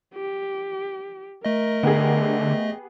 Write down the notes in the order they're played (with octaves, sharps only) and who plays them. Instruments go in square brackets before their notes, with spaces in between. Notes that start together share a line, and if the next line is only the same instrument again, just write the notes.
[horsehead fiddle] G4
[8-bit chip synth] A3 D#5 [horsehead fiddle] A#4
[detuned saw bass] D3 [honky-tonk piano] B3 G4 G#4